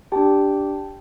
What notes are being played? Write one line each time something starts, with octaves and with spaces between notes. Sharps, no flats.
D4 G4 G5 A5